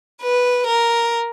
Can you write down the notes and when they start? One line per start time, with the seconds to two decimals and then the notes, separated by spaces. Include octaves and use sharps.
0.22 B4
0.67 A#4